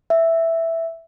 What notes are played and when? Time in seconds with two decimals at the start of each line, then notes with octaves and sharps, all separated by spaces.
0.10 E5